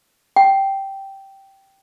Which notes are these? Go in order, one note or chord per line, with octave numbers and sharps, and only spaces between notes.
G5